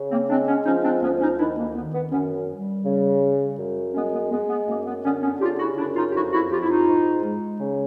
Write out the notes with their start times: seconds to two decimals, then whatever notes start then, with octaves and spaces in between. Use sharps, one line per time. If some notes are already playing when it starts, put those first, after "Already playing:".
Already playing: C#3
0.11 A#3 C4
0.30 G#3 C4 D4
0.48 B3 C#4
0.66 F3 C#4 D#4
0.84 C4 D4
1.02 D2 B3 C#4
1.21 C#4 D#4
1.39 D#3 D4 E4
1.58 A#3
1.75 D#3 B3
1.94 B3
2.12 F#2 B3 C#4
2.49 G3
2.85 C#3
3.22 G3
3.58 F#2
3.94 G#3 B3 C#4
4.13 B3
4.31 G#3 B3
4.49 B3
4.67 F#2 A#3
4.86 B3
5.04 D3 B3 C#4
5.23 B3 C#4
5.41 C#3 F4 G4
5.59 E4 F#4
5.77 F#2 D4 E4
5.96 D#4 F4
6.09 G4
6.14 F2 E4 F#4
6.32 E4 F#4
6.51 F2 F4 G4
6.62 E4
6.69 D#4 F4
6.87 G#2
7.24 G#3
7.60 C#3